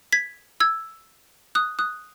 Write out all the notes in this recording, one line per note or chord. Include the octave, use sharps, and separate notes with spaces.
G#6 B6
E6 G#6
D#6 F#6
D#6 F#6